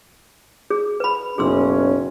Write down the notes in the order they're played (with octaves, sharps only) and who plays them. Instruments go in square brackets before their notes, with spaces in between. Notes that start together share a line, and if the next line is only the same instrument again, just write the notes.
[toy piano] G#4
B4 B5
[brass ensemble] F#1 B1 C#4 [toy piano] G#4 C6 E6